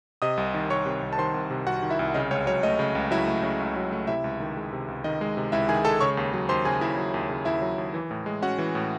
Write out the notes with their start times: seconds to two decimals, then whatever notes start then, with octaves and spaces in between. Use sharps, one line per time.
0.22 C3 D#5 D#6
0.37 C2
0.54 D#3
0.70 C2 C#5 C#6
0.86 C3
1.02 C2
1.13 A5
1.18 D#3 C5 C6
1.34 C2
1.51 C3
1.66 C2 F#4 F#5
1.82 D#3
1.90 E4 E5
1.99 C2
2.14 C#3 D#5
2.31 C#2 C#5
2.47 F#3 C#5
2.63 A3 D#5
2.79 C#3
2.95 C#2
3.11 F#3 E4 E5
3.27 A3
3.43 C#3
3.60 C#2
3.76 F#3
3.92 A3
4.07 C3 E4 E5
4.24 C#2
4.40 D#3
4.57 G#3
4.73 C3
4.88 C#2
5.04 D#3 D#5
5.21 G#3
5.37 C3
5.52 C#2 E4 E5
5.69 D#3 G#4 G#5
5.85 G#3 A4 A5
6.00 C#3 C#5 C#6
6.17 D#2
6.33 F#3
6.49 D#2 C5 C6
6.65 C#3 G#4 G#5
6.81 D#2 E4 E5
6.97 F#3
7.14 D#2
7.30 C#3
7.45 D#2 E4 E5
7.62 F#3
7.78 D#2
7.94 E3
8.11 A2
8.26 G#3
8.42 C#4 F#4 F#5
8.58 E3
8.75 A2